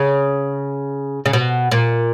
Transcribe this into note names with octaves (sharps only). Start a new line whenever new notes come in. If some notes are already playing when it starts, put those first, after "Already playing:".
Already playing: C#3
C#3
B2
A#2